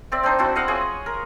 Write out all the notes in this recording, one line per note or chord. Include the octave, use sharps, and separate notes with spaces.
C4 D5 E5
C4 D4 D#4 C5
C4 D4 E4 F#4
E4 D#5 F5 F#5
F4 G#4 C#5 F#5
A#4